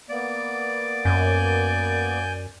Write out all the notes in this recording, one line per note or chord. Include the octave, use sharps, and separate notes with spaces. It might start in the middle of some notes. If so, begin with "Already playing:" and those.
A#3 B3 D5
F#2 G#5 G6